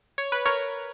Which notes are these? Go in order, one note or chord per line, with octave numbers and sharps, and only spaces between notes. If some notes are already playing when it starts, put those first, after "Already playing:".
C#5
B4
A#4 C#5